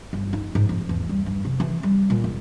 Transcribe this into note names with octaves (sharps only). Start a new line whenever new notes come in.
G1
D#4
G#2
F2
E2
G3
G2
C3
E3
G3
A#2
E1